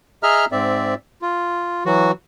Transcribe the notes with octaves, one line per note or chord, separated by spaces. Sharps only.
G#4 D#5 E5 A#5 F6
G#2 C4 D5 E5
F4
E3 F#3 F#4